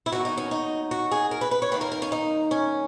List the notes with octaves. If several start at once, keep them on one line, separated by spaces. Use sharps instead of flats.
E4
D#2 D#3 F#3 B3 F#4
D#4
C#4
D#4
F#4
G#4
A#4
B4
B4
C#5
D#2 D#3 A#3 B4
A#4
A#4
C#4
D#4
C#4